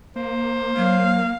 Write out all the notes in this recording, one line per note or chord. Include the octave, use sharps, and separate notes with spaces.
A#3 C5
F#3 A#3 F5